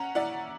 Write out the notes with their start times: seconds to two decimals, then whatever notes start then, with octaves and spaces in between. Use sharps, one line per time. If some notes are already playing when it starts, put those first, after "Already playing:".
Already playing: C#4 F#5 A#5
0.15 E4 D5 F#5